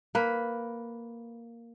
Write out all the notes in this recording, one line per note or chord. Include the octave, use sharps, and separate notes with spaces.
A#3 B4